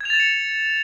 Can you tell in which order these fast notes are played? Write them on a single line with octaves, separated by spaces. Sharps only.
G#6 F7 A6 E7 C#7